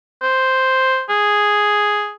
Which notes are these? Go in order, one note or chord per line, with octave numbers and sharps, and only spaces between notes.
C5
G#4